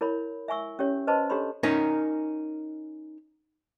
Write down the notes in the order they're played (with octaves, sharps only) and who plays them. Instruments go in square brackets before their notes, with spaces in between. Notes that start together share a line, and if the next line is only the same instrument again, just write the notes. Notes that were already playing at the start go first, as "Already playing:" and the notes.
[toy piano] E4 A#4 C#5 B5
E5 G#5 C#6 E6
C#4 G4 C#5
B4 C5 D#5 A5 C6
D4 G4 A4 C#5 B5 C6
[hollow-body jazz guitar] C#4 D#4 A#4